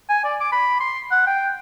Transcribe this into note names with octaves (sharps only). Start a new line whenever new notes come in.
G#5
D5
D6
B5
C6
F#5
G5